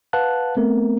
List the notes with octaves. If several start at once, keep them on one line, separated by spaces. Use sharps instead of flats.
B4 F5 F#5 A5 F#6
A3 B3 C4 A#4